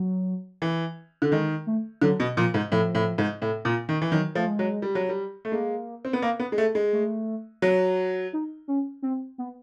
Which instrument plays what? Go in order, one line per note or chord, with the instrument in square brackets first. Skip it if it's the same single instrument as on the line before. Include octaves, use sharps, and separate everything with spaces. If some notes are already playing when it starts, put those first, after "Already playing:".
Already playing: [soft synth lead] F#3
[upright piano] E3
D3
[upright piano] D#3 [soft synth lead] G#3
[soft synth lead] A3
[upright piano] D3 [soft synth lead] F#3
[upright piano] B2
[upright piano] A#2 [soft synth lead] F3
[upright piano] G#2
[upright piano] A2 [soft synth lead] F3
[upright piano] A2
G#2
A2
A#2
D#3
E3
[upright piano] D#3 [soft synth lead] F#3
[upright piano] F3 [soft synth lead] A3
[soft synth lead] G#3
[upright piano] F#3
G3
F#3
G3
A3
[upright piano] G#3 [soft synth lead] A#3
[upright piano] C4
B3
A#3
B3
G#3
A3
G#3
[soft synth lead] A3
[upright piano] F#3
[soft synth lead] D#4
C#4
C4
B3